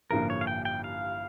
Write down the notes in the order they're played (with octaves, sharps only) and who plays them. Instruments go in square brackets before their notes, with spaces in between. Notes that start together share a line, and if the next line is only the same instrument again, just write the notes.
[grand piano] A1 G2 D3 F3 A#3 [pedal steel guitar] A#4
[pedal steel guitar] C#5
F5
G5
G5
F5